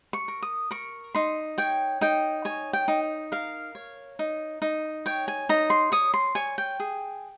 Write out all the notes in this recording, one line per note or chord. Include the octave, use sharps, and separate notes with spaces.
C#6
A#4
D#6
A#4 C#6
D#4 C6
C#5 G5
D#4 G5
C#5 G#5
G5
D#4
A#4 F5
C#5
D#4
D#4
C#5 G5
G#5
D#4 A#5
C6
C#5 D#6
C6
C#5 G#5
G5
G#4